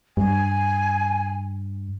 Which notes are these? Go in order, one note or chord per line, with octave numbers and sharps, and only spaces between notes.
G2 G#5